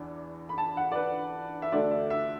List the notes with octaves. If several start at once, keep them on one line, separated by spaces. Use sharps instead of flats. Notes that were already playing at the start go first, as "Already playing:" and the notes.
Already playing: E2 E3 D4
B5
A5
F#5
D5
B4
E5
D2 D3 A3 D4 D5
E5
E5